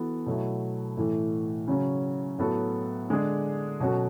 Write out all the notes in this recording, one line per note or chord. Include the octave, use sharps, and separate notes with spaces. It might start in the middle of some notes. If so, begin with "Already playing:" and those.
Already playing: E3 B3 F#4 A4
B2 F#3 A3 E4
A2 E3 A3
C#3 F#3 C#4
A2 F#3 B3 F#4 A4
D3 G#3 D4 G#4
B2 F#3 C#4 F#4 A4